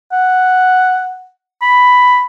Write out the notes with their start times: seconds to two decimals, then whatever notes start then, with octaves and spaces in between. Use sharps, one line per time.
0.12 F#5
1.62 B5